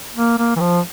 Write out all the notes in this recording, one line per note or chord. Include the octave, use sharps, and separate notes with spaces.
A#3
A#3
E3
F3